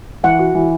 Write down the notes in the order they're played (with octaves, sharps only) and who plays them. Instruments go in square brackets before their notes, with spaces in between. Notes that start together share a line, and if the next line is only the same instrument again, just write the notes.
[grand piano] E3 [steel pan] F#5
[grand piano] F#4
E3